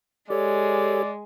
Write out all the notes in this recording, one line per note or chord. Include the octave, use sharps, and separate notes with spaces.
G#3 G4 A4 C#5 D5